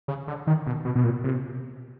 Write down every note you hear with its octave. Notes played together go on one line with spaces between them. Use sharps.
C#3
D3
D#3
B2
B2
B2
A#2
C3